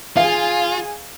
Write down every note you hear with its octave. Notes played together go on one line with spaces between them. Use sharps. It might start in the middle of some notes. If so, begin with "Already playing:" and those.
F4 G#4 F5 G#5